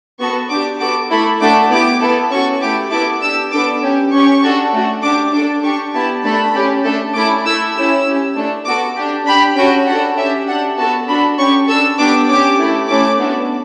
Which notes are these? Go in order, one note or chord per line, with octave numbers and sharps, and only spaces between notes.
B3 F#4 A4 C#6
D4 G4 D6
B3 F#4 A4 D6
A3 E4 A4 B5
A3 D4 F#4 A4 D6
B3 E4 G4 D6
B3 E4 A4
C#4 F#4 A4 C#6
A3 E4 G4 D6
B3 E4 A4 D6
D4 G4 E6
B3 D4 A4 D6
C#4 G4
C#4 G4 C#6
D4 F#4 A4
A3 D4 F#4
D4 G4 D6
D4 A4 D6
D4 G4 C#6
B3 E4 G4 A5
A3 D4 A4 B5
C#4 G4
A3 D4 A4
A3 C#4 E4 A4 D6
A3 E4 A4 E6
C#4 E4 G4 E6
C#4 G4
A3 D4 A4
B3 F#4 A4 D6
D4 G4
D4 G4 B5
C#4 F#4 A4 G5
D4 F#4 A4 F#5
C#4 G4 E5
D4 G4 F#5
B3 F#4 A4 A5
D4 F#4 A4 B5
C#4 G4 C#6
D4 A4 E6
B3 D4 G4 D6
C#4 G4 D6
A3 E4 A4
A3 C#4 E4 A4 D6
B3 D4 F#4 A4